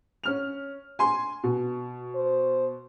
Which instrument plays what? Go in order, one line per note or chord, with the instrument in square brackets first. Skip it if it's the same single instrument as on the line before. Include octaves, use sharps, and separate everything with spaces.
[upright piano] C#4 F6 F7
G#5 C6
B2
[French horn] C5